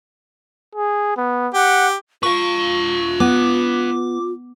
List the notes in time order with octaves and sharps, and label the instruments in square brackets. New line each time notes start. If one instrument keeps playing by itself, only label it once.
[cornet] G#4
B3
[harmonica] G4 [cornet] F#5
[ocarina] F4 [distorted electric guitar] B4 F5 [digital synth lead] C#6
[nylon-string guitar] B3 [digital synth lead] D6